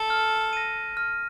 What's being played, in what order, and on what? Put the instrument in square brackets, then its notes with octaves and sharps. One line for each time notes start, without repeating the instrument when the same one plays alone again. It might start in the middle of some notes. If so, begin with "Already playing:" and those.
Already playing: [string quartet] A4
[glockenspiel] F6
A#6 D#7
F6